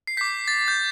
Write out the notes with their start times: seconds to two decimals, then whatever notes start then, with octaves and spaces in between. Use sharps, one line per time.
0.07 C7
0.17 D6 G6 B6
0.48 A6
0.68 G6